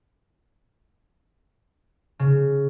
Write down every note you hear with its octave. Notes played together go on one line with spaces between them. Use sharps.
C#3